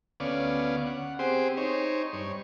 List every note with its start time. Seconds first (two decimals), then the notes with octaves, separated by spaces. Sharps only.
0.20 D2 B3 C#4 D5 F5
0.87 F#5
1.19 C4 G4 G#4 C5
1.57 D#4 C5 C#5
2.13 G2 C#5